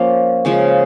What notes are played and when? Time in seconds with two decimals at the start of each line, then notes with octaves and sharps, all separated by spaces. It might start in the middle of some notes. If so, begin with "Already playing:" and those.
Already playing: F3 A#3 C#4
0.45 C#3 F3 G#3 C#4